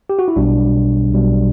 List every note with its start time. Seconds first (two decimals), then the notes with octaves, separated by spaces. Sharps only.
0.10 G4
0.19 F#4
0.28 E4
0.36 B1 B2 G3 D4
1.11 B1 B2 G3